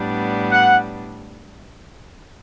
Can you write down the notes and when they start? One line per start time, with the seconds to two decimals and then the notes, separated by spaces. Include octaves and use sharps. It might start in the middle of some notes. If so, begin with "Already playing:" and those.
Already playing: A2 G3 B3 D4
0.52 F#5